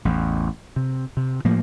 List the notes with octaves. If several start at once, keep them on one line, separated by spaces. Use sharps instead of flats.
A1 E2
C3
C3
A2 F3 A#3